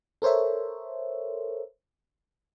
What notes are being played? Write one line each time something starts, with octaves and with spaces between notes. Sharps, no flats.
A4 A#4 C5 C#5 E5